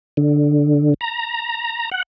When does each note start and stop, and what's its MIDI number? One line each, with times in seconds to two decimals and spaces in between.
0.17 0.94 50
1.01 1.90 82
1.92 2.02 78